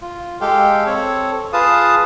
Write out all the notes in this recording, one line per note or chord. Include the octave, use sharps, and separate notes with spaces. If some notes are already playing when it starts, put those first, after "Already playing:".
F4
G#3 G4 A4 F5 G5
C4 A4 C#5
F4 G#4 B4 F5 A5 D#6